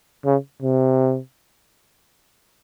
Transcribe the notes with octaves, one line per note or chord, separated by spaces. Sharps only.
C#3
C3